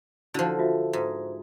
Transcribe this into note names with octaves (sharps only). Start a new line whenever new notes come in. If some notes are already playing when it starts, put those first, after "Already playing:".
D3 F3 E4 F#4 D#7
F4 F#4 E5
G#2